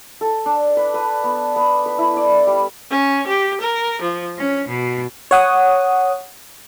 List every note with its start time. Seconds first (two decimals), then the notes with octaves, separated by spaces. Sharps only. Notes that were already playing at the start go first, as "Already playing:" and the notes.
0.21 A4
0.46 D4
0.77 B4
0.94 B4
1.24 B3
1.56 B3
1.86 B4
1.98 E4
2.17 D5
2.47 G3
2.90 C#4
3.27 G4
3.60 A#4
4.01 F3
4.38 C#4
4.68 B2
5.31 C#5 F#5 D#6